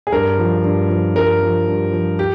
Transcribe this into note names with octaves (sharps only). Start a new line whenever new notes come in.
G#4
G2 A#4
F3
G2
F3
G2 A#4
F3
G2
F3
G4